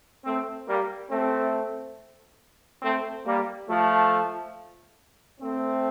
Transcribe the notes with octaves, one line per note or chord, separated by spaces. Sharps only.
A3 C4
G3 A#3
A3 C4
A3 C4
G3 A#3
F3 A3
A3 C4